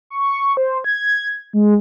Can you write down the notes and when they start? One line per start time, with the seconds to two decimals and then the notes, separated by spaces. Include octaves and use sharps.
0.10 C#6
0.57 C5
0.84 G#6
1.53 G#3